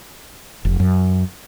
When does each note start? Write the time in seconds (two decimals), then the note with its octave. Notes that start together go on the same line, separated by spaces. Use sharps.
0.65 F1
0.80 F#2